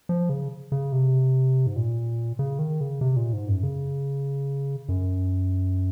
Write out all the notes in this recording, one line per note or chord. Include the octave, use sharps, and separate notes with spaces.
F3
C#3
C#3
C3
G#2
A#2
C#3
D#3
C#3
C3
A#2
G#2
F#2
C#3
F#2